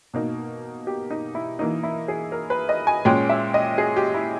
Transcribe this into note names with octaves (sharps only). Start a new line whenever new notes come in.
B2 A#3 D#4
G4
D#4
E4
E3 A#3 D#4
E4
G#4
A#4
B4
D#5
G#5
A#2 G#3 C#4 G5
E5
D#5
G#4
G4
E4